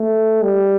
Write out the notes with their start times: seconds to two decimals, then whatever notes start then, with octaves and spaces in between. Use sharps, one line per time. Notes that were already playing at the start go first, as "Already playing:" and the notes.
Already playing: A3
0.43 G3